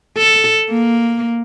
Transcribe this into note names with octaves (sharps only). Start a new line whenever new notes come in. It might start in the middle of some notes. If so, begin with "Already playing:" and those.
A4
A#3